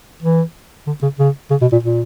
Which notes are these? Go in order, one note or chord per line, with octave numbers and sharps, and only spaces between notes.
E3
D3
C#3
C#3
C#3
B2
A#2
A#2